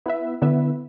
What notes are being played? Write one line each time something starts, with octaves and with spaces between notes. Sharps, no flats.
B3 E4 B4 E5
D3 B3 E4 B4 E5